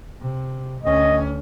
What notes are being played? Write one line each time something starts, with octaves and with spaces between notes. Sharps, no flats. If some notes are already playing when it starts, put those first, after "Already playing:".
C3
D2 C#4 D#5